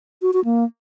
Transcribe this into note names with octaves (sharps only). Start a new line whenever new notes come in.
F#4
F#4
A#3